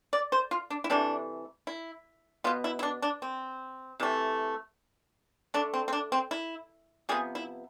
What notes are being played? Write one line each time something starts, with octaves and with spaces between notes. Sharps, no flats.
D5
C5
F4
D4
E4
C3 E3 A3 D4
E4
B2 B3 F4
E4
E4
D4
D4
C4
C3 E3 A3
D3 A3 D4
C4
C4
D4
C4
E4
C3 F3 B3 G#4
E4